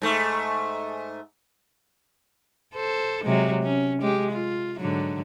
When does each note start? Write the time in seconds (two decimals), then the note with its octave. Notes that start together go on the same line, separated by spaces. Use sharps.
0.02 G#2 A3
2.74 A4 C5
3.24 C3 F#3 G#3
3.63 C#4
4.02 G#3 G4
4.31 F4
4.80 G#2 D3 F#3